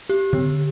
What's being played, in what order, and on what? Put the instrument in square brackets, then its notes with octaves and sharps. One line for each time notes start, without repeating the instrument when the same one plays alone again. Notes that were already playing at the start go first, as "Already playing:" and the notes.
[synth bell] G4
D3